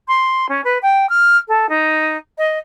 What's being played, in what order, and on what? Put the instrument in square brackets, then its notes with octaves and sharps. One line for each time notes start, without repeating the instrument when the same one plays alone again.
[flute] C6
C#4
B4
G5
F6
A4
D#4
D#5